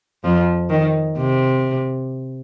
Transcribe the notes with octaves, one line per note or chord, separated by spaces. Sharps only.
F2 F3
D#3
C3